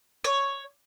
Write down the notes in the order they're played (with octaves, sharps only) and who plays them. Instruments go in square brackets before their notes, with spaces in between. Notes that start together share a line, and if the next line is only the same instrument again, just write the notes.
[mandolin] C#5